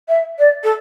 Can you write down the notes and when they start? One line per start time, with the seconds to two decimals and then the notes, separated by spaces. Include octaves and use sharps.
0.08 E5
0.38 D5
0.63 A4